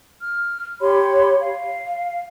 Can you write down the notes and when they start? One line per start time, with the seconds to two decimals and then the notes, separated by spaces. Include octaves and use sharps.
0.20 F6
0.81 G4 C#5 B5 C6
1.40 F5